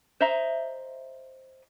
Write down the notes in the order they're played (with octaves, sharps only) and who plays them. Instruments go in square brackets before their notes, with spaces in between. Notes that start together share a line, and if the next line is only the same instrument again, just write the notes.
[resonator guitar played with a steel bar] C5 D#5 E5 A#5